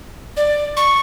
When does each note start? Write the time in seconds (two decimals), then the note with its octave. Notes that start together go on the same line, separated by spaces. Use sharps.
0.37 D5
0.77 C#6